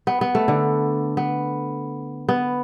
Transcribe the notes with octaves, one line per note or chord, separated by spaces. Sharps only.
B3
B3
A3
D3
B3
B3